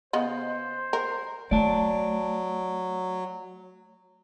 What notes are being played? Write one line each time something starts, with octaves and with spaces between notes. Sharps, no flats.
C#3 B3 C5 D#5
A#4
F#3 A3 D5 A5